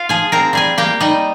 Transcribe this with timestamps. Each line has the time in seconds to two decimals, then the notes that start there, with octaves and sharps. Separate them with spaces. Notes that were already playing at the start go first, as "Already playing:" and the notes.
Already playing: F4 F5
0.09 F3 G#4 G#5
0.32 C4 A#4 A#5
0.53 G3 G#4 G#5
0.78 A#3 G4 G5
1.00 G3 D#4 D#5